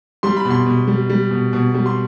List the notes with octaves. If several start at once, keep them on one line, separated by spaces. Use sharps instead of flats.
G3 C6
B5
B2
C6
B2
G3
G3
B2
B2
G3
C6